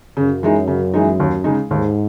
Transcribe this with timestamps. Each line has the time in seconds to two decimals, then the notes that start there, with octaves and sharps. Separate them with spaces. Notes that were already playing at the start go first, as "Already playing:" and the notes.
0.17 F#2 C#3
0.43 E3 G#3 D#4
0.68 C#3
0.94 E3 G#3 D#4
1.20 D#2
1.44 C#3 G#3 D#4
1.70 D#2 G#2